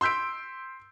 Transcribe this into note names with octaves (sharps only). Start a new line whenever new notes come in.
C6 E6 G6 B6 D7